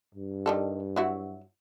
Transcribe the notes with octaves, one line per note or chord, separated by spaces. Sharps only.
G2
D#3 G3 A4
F#3 E4 F#4